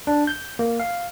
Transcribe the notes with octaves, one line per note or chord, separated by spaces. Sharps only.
D4
G6
A#3
F5